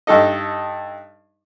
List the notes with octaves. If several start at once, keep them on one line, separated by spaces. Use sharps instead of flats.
G2 D#4 A4 D#5